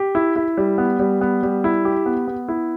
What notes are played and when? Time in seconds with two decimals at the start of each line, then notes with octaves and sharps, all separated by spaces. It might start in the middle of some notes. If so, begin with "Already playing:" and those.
Already playing: G4
0.15 E4
0.36 E4
0.57 G3
0.78 B3
0.99 G3
1.21 B3
1.43 G3
1.64 E4
1.85 G4
2.06 B3
2.28 B3
2.48 E4